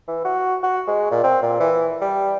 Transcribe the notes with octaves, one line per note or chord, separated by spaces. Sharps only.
E3
F#4
F#4
G#3
A#2
C4
A#2
E3
G3